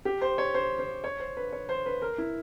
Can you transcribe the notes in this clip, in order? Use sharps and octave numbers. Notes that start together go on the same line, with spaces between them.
G4
C5
C#5
C5
C5
C#5
C5
B4
C#5
C5
B4
A#4
E4